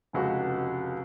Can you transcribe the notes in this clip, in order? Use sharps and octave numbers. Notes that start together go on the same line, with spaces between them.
F1 C#2 F#4